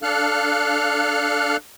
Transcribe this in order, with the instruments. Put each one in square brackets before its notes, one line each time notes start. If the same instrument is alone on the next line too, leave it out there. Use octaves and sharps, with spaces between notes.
[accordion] D4 A4 F5 F6 F#6